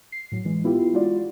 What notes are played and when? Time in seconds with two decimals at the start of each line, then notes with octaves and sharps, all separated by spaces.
0.12 C7
0.32 A2 F#3
0.45 E3 G#3
0.64 B3 E4 F4 G4
0.94 G#3 D#4 F4 F#4 D5